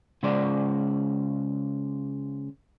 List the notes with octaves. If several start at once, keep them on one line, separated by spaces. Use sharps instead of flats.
C#3 G#3 C5 D5